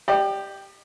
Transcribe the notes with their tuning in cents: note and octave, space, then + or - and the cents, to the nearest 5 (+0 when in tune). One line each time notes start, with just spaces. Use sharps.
G4 +0 D5 +40